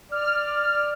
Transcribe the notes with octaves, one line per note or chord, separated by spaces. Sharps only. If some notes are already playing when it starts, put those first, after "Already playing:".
D5 F6